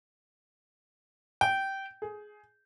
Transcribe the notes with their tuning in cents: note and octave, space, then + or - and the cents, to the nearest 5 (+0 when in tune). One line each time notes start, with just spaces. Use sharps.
G5 -15
G#4 +15